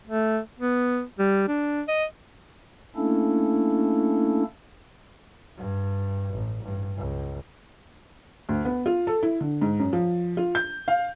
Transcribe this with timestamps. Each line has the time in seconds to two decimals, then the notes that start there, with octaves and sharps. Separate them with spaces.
0.07 A3
0.59 B3
1.19 G3
1.48 D4
1.88 D#5
2.96 A3 A#3 C#4 D4 E4 A4
5.58 G2
6.33 A1
6.63 G2
6.97 C#2
8.49 D2
8.65 B3
8.86 F4
9.07 A4
9.23 E4
9.41 D3
9.62 G#2
9.79 F#2
9.93 F3
10.37 F4
10.55 G6
10.88 F5